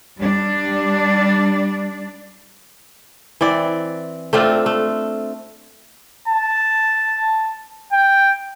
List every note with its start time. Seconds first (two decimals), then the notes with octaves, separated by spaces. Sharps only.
0.18 G3 D4
3.41 E3 C4 D5
4.33 A3 C4 D4 F4
4.66 A3
6.28 A5
7.93 G5